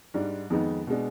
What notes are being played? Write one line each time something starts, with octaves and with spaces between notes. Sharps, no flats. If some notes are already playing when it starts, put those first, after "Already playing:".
G#2 G3 D4
F2 D#3 G#3 B3 D#4
B2 G#3 D4